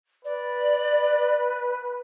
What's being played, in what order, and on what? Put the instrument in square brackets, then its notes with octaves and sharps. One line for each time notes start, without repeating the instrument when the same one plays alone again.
[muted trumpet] B4 [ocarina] D5